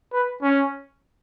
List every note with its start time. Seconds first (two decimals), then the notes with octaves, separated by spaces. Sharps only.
0.13 B4
0.43 C#4